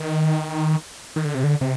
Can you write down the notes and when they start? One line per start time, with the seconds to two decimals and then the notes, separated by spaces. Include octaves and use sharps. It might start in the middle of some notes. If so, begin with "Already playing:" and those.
Already playing: D#3
1.16 D#3
1.25 D3
1.35 C3
1.44 D3
1.61 C3